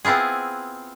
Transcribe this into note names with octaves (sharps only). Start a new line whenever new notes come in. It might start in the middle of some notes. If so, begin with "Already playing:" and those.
B3 C4 E4 F4 G#4